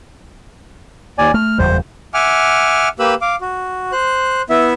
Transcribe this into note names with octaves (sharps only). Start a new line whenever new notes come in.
D#2 D5 G#5
A3 F6
F#1 E2 G3 C5
E5 F#5 G#5 D6 F6
A#3 G4 B4 B5 E6
F5 D6
F#4
C5 F#6
B3 E4 E5